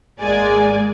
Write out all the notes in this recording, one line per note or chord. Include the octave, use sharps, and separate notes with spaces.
G#1 G#3 A#3 D5 G#5